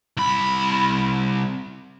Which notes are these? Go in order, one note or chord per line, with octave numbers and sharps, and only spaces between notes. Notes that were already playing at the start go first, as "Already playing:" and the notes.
C2 B5